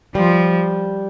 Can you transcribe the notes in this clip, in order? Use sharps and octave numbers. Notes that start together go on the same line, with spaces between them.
F3 G3